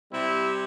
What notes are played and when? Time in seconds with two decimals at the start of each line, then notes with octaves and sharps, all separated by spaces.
0.11 C3 G3 C4 E4